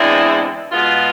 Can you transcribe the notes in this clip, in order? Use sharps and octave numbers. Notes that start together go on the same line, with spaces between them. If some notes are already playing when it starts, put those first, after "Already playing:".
Already playing: E2 D3 G#3 C4 E4
B2 G#3 B3 F4